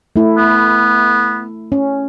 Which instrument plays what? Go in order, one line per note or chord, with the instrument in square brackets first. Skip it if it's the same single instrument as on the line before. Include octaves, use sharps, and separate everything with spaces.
[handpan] A3 E4
[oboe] B3
[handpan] C#4